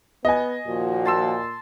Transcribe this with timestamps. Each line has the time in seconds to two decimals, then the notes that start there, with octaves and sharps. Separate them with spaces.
0.25 B3 D#5 G#5
0.67 D#2 A#2 F3 F#4
1.05 A5 C6 E6